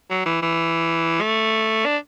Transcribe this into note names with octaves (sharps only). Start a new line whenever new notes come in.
F#3
E3
E3
A3
D4